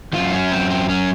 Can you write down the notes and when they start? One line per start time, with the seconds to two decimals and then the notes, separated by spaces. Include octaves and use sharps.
0.13 F#2 D#3 F4
0.33 C#4
0.52 C4
0.70 C4
0.89 C#4